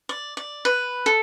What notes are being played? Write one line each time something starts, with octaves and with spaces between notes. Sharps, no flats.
D5
D5
B4
A4